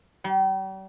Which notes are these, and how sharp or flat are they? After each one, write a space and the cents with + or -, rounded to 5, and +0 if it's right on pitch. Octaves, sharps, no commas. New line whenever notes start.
G3 -40